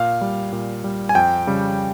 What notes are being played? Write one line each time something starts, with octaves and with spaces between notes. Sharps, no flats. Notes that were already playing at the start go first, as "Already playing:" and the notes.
Already playing: A#2 F5
G3
A#2
G3
G#5
F2 G5
C#3 G3